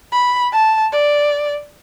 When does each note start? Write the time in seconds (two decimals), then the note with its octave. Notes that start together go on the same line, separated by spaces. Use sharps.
0.12 B5
0.52 A5
0.92 D5